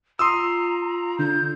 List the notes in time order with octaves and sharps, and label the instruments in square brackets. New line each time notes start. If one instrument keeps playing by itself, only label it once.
[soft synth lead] F4 [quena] A#5 [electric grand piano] C6 D#6 E6
[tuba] D3 [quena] G6